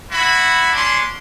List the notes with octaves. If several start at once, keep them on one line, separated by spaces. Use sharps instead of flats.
E4 F#4 B5
C#4 D4 C6